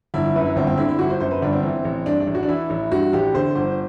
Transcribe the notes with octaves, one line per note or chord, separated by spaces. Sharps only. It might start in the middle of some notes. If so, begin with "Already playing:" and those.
G1 E4
F#2 B4
E4
G1 C4
C4
D3 E4
E4
G1 F#4
C5
F#2 C5
B4
G1 D4
C4
E3
A1
G2 D4
D4
A1
F#4
D4
E3 E4
A1
G2 F#4
A1 G4
D3 C5
G1 C5